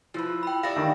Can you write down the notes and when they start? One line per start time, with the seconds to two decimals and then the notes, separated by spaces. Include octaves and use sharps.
0.14 F3 E4 F4 B4 E6
0.43 G5 B5
0.63 G4 A4 D5 E5 F5 G5 A#6
0.76 D#3 G#5 B5 C#6